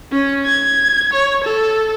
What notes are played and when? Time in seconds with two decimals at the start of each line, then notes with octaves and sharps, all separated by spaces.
0.12 C#4
0.46 G#6
1.13 C#5
1.44 A4